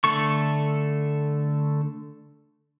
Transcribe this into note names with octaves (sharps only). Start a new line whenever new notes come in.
D3 A3 A4 C#6